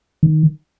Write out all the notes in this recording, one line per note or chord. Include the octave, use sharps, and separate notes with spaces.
D#3